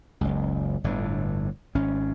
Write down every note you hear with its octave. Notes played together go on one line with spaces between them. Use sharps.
F#1 C#2
G1 A2 D3
G#1 C#4